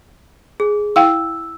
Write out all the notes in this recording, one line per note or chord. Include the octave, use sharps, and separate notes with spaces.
G#4
E4 F5 G5 E6